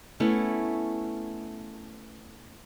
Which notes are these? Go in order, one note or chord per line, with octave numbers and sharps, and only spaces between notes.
A3 B3 C#4 E4